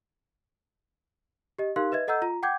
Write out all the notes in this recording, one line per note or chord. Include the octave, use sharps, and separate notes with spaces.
G4 D#5
D#4 G4 A#4 F5 C6 F#6
B4 D#5 E5 G#6
A4 D#5 F#5 A#5 E6 G6
F4 A#5
F#5 G5 D6 G6 G#6